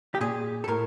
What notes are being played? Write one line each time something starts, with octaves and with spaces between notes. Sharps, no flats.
G4
A#2 G#4
A4
A2 A#4